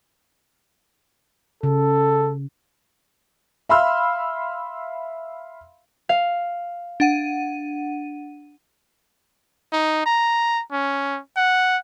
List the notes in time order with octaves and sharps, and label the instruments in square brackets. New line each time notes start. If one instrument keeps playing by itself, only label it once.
[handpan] C#3 [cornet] A4
[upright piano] E5 F5 B5 C6 E6 F6
[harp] F5
[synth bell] D4 F#5 D#7
[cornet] D#4
A#5
C#4
F#5